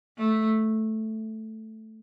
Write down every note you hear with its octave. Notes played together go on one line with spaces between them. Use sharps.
A3